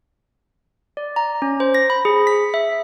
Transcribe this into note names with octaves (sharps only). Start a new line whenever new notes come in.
D5
A#5
C#4
C5
A#6
B5
G#4
B6
E5